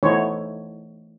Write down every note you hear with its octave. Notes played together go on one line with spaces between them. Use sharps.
E3 A3 B3 D#4 C5 C#5